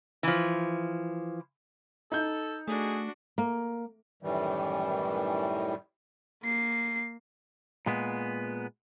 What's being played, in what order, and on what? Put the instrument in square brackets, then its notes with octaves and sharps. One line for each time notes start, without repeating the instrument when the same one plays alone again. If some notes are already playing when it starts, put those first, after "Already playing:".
[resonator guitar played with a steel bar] E3 F3
[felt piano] D#4 G6 [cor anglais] A4
[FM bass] A3 [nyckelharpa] D4 F#4 [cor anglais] G#4
[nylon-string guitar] A#3
[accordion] F#2 A2 D#3 E3 G3
[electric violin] A#3 C7
[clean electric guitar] A#2 G#3 B3